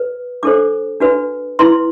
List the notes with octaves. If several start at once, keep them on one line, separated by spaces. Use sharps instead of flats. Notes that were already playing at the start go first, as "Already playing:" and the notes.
Already playing: B4
D4 A4 C5 D6
D4 F#4 B4
E4 B4 C6